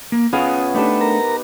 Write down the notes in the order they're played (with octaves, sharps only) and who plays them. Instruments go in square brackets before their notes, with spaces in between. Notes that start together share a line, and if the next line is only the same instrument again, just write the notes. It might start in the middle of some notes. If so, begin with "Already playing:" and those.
[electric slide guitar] A#3
[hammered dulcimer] B3 [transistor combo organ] C#4 [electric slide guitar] F4 G#4 F5
[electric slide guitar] A3 D4 [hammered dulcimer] D#4 G4 B4
[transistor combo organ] A#4 A#5